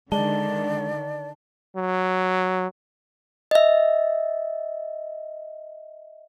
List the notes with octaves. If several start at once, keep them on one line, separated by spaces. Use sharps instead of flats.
D3 D#3 G#3 D5 A5 G7
F#3
D#5 E5